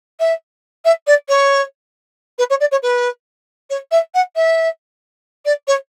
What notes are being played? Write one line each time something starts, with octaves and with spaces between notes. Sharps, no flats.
E5
E5
D5
C#5
B4
C#5
D5
C#5
B4
C#5
E5
F#5
E5
D5
C#5